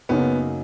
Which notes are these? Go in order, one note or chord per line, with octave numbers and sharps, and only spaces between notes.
F#2 C#3 F#3 A#3 B3 D#4